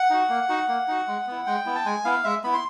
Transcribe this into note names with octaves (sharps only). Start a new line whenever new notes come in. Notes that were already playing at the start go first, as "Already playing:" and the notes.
Already playing: F#5
D#4 F#4
A#3
D#4 F#4
A#3
D#4 F#4
G#3
B3 E4
G#3 G5
B3 E4
A5
G#3 G#5
B3 E4 F5
G#3 E5
B3 E4 B5
C6